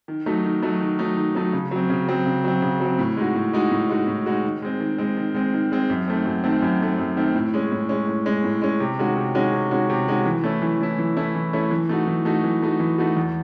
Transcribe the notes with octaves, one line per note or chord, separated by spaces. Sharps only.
D#3
F#3 A3 D#4
D#3
F#3 A3 D#4
D#3
F#3 A3 D#4
D#3
F#3 A3 D#4
C#3
F#3 C4
C#3
F#3 C4
C#3
F#3 C4
C#3
F#3 C4
A2
G#3 D#4 F#4
A2
G#3 D#4 F#4
A2
G#3 D#4 F#4
A2
G#3 D#4 F#4
D#3
G#3 C4
D#3
G#3 C4
D#3
G#3 C4
D#3
G#3 C4
F#2
D#3 A3 C4
F#2
D#3 A3 C4
F#2
D#3 A3 C4
F#2
D#3 A3 C4
A2
G#3 C#4
A2
G#3 C#4
A2
G#3 C#4
A2
G#3 C#4
C3
D#3 G#3 C#4 F#4
C3
D#3 G#3 C#4 F#4
C3
D#3 G#3 C#4 F#4
C3
D#3 G#3 C#4 F#4
E3
A3 C#4 E4
E3
A3 C#4 E4
E3
A3 C#4 E4
E3
A3 C#4 E4
E3
A3 D#4 F#4
E3
A3 D#4 F#4
E3
A3 D#4 F#4
E3
A3 D#4 F#4
E2